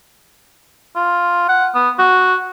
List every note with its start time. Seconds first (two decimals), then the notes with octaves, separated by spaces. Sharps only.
0.96 F4
1.49 F#5
1.75 B3
1.99 F#4